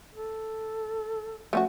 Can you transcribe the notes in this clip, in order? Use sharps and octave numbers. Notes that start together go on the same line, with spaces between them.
A4
F3 A3 C#4 F#4